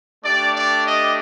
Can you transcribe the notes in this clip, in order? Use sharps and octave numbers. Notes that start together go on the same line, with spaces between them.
A3 D4 G4 D5
D5
D#5